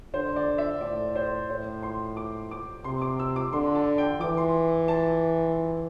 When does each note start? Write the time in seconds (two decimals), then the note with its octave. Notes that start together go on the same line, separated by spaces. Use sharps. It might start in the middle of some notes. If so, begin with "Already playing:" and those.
0.14 D3 C5
0.36 D5
0.58 E5
0.81 A2 D5
1.15 C5
1.49 A2 C5
1.83 C6
2.17 D6
2.51 D6
2.84 C3 C6
3.01 D6
3.20 E6
3.36 D6
3.52 D3 C6
3.75 A5
3.98 G5
4.20 E3 D6
4.37 C6
4.88 A5